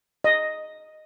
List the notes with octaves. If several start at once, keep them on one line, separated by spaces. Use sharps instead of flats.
D#5